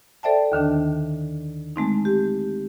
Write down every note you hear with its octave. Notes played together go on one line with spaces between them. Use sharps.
A4 C5 D5 E5 G5 A5
D#2 D3 D#3 D4
G#3 A3 C4 D#4
G4